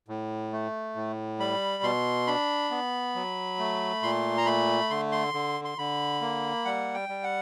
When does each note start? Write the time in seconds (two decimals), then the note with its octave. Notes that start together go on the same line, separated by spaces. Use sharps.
0.08 A2
0.53 A3
0.96 A2
1.39 G3 B5
1.83 B2 C6
2.27 D4 B5
2.71 B3
3.15 F#3
3.59 A3
4.03 A#2 C6
4.37 A#5
4.46 A3 B5
4.90 D3 C6
5.12 C6
5.34 D3
5.65 C6
5.78 D3 B5
6.21 A#3
6.65 G3 F#5
6.94 G5
7.09 G3
7.23 F#5